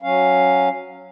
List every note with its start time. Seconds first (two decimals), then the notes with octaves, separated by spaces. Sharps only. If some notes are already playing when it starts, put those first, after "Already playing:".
0.02 F#3 C#4 F5